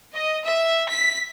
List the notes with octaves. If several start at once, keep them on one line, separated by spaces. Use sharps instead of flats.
D#5
E5
B6